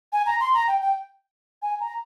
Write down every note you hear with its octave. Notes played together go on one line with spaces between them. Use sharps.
G#5
A#5
C6
A#5
G5
G5
G#5
A#5